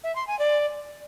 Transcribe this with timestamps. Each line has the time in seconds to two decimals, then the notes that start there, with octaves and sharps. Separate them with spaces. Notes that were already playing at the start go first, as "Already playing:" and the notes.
0.04 E5
0.16 C6
0.27 G#5
0.39 D5